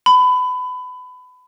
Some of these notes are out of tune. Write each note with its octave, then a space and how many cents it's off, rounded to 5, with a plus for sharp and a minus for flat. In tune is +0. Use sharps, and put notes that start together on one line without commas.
B5 +25